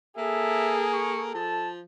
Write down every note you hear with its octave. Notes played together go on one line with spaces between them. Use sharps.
A#3 G#4 A4 E5
A4 C#6
F3 A5